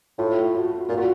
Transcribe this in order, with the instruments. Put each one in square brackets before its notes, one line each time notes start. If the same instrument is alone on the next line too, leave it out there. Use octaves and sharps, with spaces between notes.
[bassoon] A2 [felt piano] F4
[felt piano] F#4
[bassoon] A#2 [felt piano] F4
[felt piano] F#4